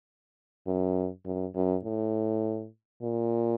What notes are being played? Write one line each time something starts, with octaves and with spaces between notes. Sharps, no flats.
F#2
F#2
F#2
A2
A#2